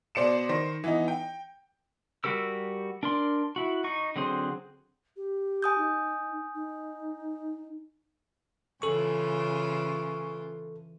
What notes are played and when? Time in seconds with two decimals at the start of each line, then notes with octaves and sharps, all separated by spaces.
0.15 B2 C5 D5 C#7 E7
0.49 D#3 C5 A#6
0.84 E3 B3 D#4
1.08 G5
2.24 G3 F#4 G4 A#4 E6
3.03 D4 A#4 D5 C6
3.56 E4 F#4
3.84 D#4 C#6
4.16 D3 F#3 C4 G#4 C5
5.17 G4
5.62 G#5 D#6 G6
5.78 D#4
6.55 D#4
8.82 C#3 E3 C#4 F4 A4 C#6